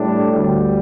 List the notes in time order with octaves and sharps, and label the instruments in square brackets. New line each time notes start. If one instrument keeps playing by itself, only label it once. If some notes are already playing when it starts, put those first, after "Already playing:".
Already playing: [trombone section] A2 G3 D4
D2 D3 G3